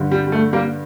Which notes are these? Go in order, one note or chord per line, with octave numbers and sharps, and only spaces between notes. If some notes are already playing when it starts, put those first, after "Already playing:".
Already playing: G2 D3
G3
G3
A3
G3 A#3